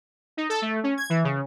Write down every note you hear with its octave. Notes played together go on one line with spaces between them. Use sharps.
D#4
A4
A3
C#4
G#6
E3
C#3